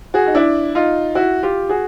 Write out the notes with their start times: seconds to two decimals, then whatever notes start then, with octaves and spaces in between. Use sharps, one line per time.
0.14 F#4 G#4
0.26 D#4
0.34 D4 E4
0.75 D#4 F4
1.15 E4 F#4
1.43 F4 G4
1.69 F#4 G#4